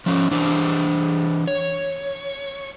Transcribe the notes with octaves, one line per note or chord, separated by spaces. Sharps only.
F3 C#4
E3 D4 C5
C#5